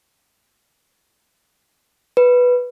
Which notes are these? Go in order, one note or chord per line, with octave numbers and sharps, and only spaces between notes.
B4